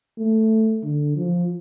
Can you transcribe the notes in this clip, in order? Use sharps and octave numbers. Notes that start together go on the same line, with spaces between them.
A3
D3
F3